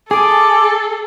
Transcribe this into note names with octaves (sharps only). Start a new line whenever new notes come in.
G#4 A4 G#5 D6